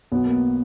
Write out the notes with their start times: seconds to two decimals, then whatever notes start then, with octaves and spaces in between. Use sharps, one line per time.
0.12 B1 B2 B3
0.26 A#3
0.33 B3